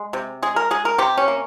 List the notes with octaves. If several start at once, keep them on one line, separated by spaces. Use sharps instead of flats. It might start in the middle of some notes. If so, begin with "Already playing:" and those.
Already playing: G#3
C3
G#3 G#4
A#4
G#3 G#4
A#4
C3 G4
C#4
A#3